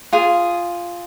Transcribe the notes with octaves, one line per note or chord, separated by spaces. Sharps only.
F4 G#4